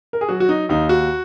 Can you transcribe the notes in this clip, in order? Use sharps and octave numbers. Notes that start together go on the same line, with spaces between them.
A#4
G#4
F#3 F#4
F#4
D#4
D#2 D#4
F#4